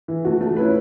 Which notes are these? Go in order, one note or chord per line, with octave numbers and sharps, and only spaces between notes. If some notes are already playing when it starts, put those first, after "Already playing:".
E3
A3 F#4
A3
C#4 E4 B4